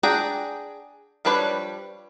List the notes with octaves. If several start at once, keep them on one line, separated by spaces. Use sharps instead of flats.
D4 G#4 F#5 G5 A#5
F3 G3 D4 B4 C#5